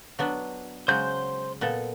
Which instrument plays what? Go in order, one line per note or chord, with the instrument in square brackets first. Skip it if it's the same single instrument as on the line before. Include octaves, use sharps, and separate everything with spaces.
[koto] F#3 B3 D4
[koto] C#3 F#3 G#3 [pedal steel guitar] C5 G6
[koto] A#2 B3 A4